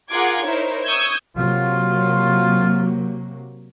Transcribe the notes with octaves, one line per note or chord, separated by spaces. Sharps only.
F4 G#4 A#4 F#5 D6 G#6
D#4 E4 A#4 C5 C#5
C#6 D#6 E6 G6 G#6
C3 F#3 A#3 F4